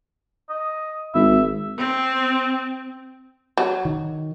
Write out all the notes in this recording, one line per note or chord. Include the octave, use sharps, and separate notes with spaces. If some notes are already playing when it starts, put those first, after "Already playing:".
D#5
G#1 E5
C4
F#3
D#3